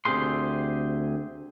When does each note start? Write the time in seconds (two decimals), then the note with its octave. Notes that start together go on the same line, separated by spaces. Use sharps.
0.05 D2 C4 G4 G#4 C6